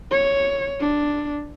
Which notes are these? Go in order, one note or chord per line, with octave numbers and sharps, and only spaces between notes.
C#5
D4